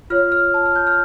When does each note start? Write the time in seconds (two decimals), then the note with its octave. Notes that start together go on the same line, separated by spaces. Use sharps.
0.10 F4 C#5 F6
0.32 F6
0.54 A5
0.66 F6
0.76 G6
0.87 F6